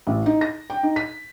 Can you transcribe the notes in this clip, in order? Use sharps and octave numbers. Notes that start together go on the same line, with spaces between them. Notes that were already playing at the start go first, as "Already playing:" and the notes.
A1
D#4
A#6
G5
D#4
B6